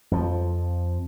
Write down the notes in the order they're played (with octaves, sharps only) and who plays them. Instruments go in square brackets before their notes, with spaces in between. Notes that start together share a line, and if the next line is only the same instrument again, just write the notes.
[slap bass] F2 F3